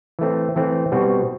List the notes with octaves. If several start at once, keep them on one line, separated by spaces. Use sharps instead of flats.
E3 A3 C4
E3 A3 C4
B2 G3 C4 F#4